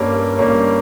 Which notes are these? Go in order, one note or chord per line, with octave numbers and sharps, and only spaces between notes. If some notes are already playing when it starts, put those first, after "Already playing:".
Already playing: G2 G3 A#3 C#4
G2 G3 A#3 C#4